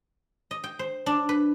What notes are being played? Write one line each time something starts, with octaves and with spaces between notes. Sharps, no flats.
D#5
G5
C5
D4
B4